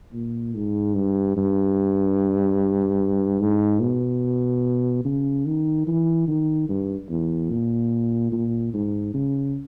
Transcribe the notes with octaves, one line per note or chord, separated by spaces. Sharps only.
A#2
G#2
G2
G2
G#2
B2
C#3
D#3
E3
D#3
G2
E2
A#2
A#2
G#2
C#3